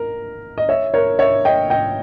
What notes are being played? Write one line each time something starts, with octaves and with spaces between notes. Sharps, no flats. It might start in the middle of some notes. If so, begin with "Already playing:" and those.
Already playing: A#4
D#5
C#5 E5
A#4 C#5
C#5 E5
D#5 G5
D#5 G5